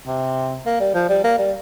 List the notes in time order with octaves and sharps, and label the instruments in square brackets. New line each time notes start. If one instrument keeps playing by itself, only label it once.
[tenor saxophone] C3
A#3
G3
F3
G3
A#3
G3